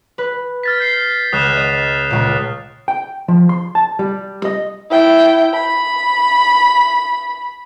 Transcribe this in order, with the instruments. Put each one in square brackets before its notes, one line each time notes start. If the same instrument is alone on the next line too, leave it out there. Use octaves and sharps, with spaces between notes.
[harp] B4
[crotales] F6 A6 B6
G6 C7
[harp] C#2 A#6 [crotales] D#6 F#6 E7
[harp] D#5 E5
C#2 A#2
[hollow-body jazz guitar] G5
F3
C6
A5
G3
D#5
[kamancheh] E4 G5
B5